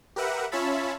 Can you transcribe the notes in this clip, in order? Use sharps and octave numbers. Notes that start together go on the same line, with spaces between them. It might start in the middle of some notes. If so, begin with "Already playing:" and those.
G4 A#4 B4 E5 F#5
C#4 F4 C#5 E5 A5 B5